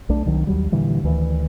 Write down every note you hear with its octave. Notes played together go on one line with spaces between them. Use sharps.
B1 A3 D4
C2 D#3 F#3
D#2 F#3 G3
A#2 D3 E3 G3
D2 D#3 E3